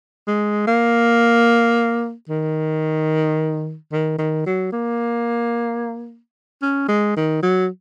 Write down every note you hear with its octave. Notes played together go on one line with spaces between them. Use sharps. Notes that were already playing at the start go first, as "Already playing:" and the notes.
G#3
A#3
D#3
D#3
D#3
F#3
A#3
C#4
G#3
D#3
F#3